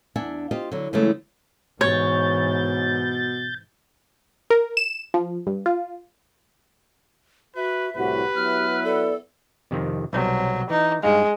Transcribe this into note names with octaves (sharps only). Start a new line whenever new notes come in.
E2 D4 E5 F#5 G#5
F4 G4 C5 D#5
D3 F#3 E4
C#3 E3 F#3 G#3 A3
G#2 B2 E3 C#5 G6 A6
A#4
E7
F3
G2
F4
F#4 B4 E5
C2 A2 F#4 G4 B4
F#3 B3 E4 F6
A4 D5
F2 C3 D#3
B1 C3 F#3 G3
E3 D#4
G2 G#3 D#4 F5